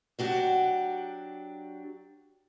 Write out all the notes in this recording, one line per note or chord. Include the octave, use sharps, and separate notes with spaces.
F#3 D4 F#4 G4